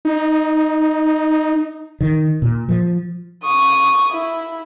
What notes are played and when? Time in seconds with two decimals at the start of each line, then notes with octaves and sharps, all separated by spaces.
0.05 D#4
2.01 D#3
2.42 A#2
2.69 F3
3.44 C#6 D#6
4.13 E4